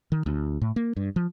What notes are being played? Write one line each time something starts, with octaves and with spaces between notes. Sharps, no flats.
D#3
D2
A2
A#3
G2
F3